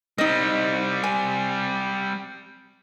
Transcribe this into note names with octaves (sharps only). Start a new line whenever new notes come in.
G3 C4 D#4 D#5
G#5